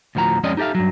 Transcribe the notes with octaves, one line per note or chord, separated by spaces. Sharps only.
D2 A2 F3 F#4 A#5
F2 G#3 C#4 D5 D#5
D#4 G4 A4 E5 F5
G2 F#3